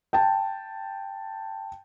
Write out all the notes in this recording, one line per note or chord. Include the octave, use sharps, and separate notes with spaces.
G5 A5